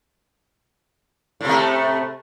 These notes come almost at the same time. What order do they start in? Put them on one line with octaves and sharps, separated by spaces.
A2 C3 A3